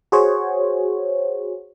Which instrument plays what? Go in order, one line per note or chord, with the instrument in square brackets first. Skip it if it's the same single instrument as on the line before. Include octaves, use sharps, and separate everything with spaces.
[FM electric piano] F#4 G#4 C5 C#5